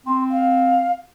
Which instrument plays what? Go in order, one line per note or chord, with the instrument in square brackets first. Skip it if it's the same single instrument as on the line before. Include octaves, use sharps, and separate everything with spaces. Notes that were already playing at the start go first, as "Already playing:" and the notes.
[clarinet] C4 [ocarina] C6
[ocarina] F5